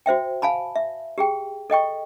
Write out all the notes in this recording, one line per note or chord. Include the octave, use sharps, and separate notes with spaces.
F#4 C5 E5 G5
F5 G#5 A5 B5
E5
G4 G#4 G5
A4 D#5 G5 C#6